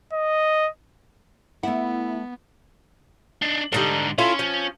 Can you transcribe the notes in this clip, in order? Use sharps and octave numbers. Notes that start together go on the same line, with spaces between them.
D#5
A3 B3 E4 F#5
D4 D#4
G#2 D3 G3 D#4 A4
C#4 E4 F4 A4
F3